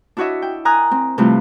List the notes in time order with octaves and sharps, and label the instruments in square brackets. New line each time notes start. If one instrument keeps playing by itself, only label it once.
[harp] D4 E4 F#4 C#5 D#5 E5
G5
A#4 G#5 A#5 D#6 F#6
C4
C3 E3 F3 G3 A3 C4